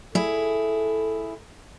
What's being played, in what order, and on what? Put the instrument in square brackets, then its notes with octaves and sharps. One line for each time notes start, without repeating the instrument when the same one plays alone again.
[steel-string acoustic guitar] E4 G#4 [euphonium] A4